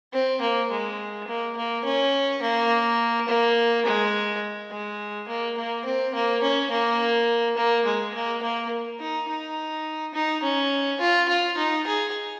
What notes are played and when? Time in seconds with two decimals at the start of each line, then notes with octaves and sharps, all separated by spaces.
0.13 C4
0.41 A#3
0.70 G#3
1.28 A#3
1.56 A#3
1.85 C#4
2.42 A#3
3.28 A#3
3.86 G#3
4.71 G#3
5.28 A#3
5.57 A#3
5.85 C4
6.14 A#3
6.42 C#4
6.71 A#3
7.57 A#3
7.86 G#3
8.14 A#3
8.42 A#3
9.00 D#4
9.28 D#4
10.14 D#4
10.43 C#4
11.01 F4
11.28 F4
11.57 D#4
11.86 G#4